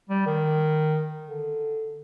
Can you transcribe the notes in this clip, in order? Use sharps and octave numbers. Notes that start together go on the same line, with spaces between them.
G3
D#3
D3